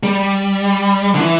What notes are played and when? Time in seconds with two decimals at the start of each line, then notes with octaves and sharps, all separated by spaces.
0.03 G3
1.15 D3
1.20 E3